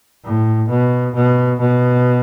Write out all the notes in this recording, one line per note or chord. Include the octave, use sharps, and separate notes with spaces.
A2
B2
B2
B2